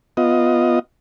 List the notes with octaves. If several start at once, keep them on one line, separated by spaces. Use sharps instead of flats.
B3 F4 D#5